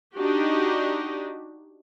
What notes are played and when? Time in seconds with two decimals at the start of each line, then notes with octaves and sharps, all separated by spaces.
0.15 D4 D#4 F#4 G4